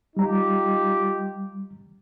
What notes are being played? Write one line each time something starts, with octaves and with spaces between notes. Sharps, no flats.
G3 D#4 F4 G4 A#5